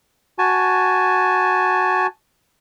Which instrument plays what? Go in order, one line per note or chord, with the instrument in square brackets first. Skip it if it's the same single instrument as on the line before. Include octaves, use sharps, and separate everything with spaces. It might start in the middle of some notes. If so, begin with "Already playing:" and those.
[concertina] F#4 G#5 A5